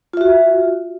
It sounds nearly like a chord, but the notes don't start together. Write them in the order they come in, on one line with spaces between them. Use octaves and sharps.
F4 E5 F#4